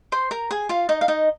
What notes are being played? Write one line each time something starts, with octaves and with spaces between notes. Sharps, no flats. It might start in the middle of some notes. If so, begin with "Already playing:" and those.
C5 C6
A#4 A#5
G#4 G#5
F4 F5
D#4 D#5
F5
D#4 D#5